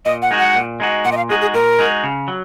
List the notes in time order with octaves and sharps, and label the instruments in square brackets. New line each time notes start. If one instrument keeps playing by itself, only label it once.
[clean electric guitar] A#2 [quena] D#5
[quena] F#5
[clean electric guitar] G#3 D#4 F#4
[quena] F#5
[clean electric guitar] A#2
G#3 D#4 F#4
[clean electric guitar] A#2 [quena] F#5
[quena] D#5
F5
[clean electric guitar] G#3 D#4 F#4 [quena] G#4
[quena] G#4
[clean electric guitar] A#2 [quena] A#4
[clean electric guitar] G#3 D#4 F#4
C#3
F#3